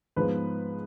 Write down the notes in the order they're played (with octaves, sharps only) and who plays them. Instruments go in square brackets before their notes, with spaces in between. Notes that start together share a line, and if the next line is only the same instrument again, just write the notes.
[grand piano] G#2 F3 G#3 B3 B4